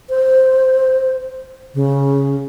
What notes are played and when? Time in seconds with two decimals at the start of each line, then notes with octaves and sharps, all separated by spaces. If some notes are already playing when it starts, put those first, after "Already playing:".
0.09 C5
1.74 C#3